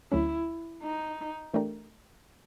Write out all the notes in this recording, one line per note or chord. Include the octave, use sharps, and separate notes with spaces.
D2 D3 F#3 A3 C#4 E4
D#4
E3 A3 D4 G4 A#4